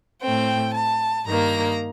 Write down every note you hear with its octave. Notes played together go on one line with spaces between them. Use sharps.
A2 A3 C4 G5
A5
G2 D#3 A#3 A#5